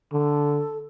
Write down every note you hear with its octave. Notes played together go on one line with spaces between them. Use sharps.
D3 A4